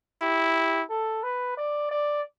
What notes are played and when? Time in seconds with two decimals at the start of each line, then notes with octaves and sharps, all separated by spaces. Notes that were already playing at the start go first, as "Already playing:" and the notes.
0.22 E4 G4
0.89 A4
1.23 B4
1.57 D5
1.91 D5